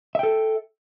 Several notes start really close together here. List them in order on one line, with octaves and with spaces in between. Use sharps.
E5 G5 A4